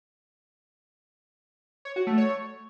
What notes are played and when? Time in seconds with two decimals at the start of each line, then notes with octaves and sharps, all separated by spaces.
1.85 C#5
1.96 F#4
2.07 A3
2.18 C#5